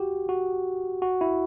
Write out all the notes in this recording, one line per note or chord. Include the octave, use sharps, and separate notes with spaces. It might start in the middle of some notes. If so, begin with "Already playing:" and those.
Already playing: F#4 G4
F#4
F#4
E4